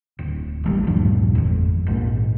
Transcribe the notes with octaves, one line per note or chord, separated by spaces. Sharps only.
D1
G#1 E3 G3
D2 G2 A#2 F3
G#1 F2
A#1 G#2